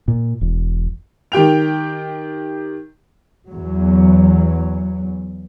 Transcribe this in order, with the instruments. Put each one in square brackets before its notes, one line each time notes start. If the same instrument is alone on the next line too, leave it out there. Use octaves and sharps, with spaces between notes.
[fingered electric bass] A#2
E1
[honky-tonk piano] D#3 G4 G5 F7
[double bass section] E2 F#3